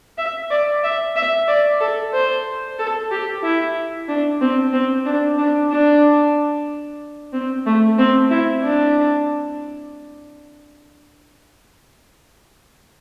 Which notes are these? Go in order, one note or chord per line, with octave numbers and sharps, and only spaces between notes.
E5
D5
E5
E5
D5
A4
C5
A4
G4
E4
D4
C4
C4
D4
D4
D4
C4
A3
C4
E4
D4